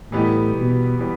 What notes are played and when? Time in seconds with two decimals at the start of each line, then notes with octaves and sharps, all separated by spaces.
0.12 A2 E3 G3 B3 D#4 G4
0.56 B2
0.99 E3 G3 B3 G4